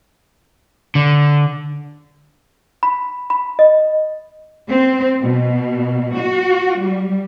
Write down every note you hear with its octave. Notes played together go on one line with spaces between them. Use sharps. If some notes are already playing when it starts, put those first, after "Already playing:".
D3
B5
B5
D#5
C4
B2
F#4
G3